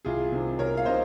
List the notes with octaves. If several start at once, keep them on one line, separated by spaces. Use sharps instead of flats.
C2 F4 G#4
C3 D#3
C2 A#4 C#5
F5
C3 D#3 C5 D#5